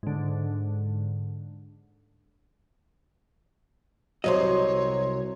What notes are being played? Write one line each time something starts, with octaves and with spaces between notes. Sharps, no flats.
G#2 D3
C2 A#2 F#3 C5 C#5 D#5